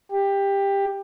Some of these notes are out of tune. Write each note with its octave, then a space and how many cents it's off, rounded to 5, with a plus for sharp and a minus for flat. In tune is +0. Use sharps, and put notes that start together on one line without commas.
G4 +15